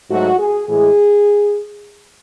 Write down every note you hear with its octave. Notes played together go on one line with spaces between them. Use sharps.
G#2 F#3 A3 F#4
G#4
A2 E3 G#3 G#4